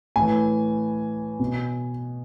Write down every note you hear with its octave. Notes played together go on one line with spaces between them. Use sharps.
A2 E3 G#5
B2